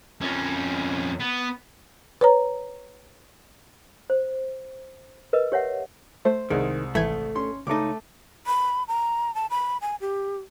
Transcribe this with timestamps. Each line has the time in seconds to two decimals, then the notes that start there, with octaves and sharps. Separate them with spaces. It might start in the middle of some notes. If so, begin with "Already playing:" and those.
0.21 F2 C#4
1.20 B3
2.21 B4 C#5 A#5
4.10 C5
5.33 A#4 B4 D#5
5.52 G4 C#5 E5 F#5
6.25 A3 C5
6.50 C2 D#3 G#3
6.95 G#1 E3 A3 G#6
7.35 C#4 C6
7.67 C#2 A3 D#4 D6
8.47 B5
8.88 A#5
9.35 A5
9.50 B5
9.82 G#5
10.01 G4